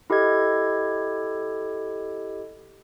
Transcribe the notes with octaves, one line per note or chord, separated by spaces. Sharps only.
E4 G4 A4 D#5 G#6